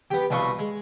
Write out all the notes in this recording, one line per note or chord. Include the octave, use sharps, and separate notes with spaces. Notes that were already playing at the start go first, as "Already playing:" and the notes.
B3 G4
C2 B2 F4 B4 D#5 C#6
G#3